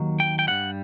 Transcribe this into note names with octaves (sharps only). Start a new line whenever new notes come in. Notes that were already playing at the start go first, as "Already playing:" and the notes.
Already playing: D#2 D#3 F#3
G5
G5
G2 E3 G3 F#5